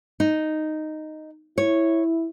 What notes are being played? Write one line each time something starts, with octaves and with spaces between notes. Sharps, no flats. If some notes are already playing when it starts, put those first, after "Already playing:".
D#4
E4 C#5